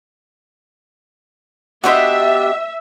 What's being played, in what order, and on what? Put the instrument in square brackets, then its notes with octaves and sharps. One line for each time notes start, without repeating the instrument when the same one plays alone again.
[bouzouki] B3 D4 G4 [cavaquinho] F#4 C5 D#5 [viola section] E5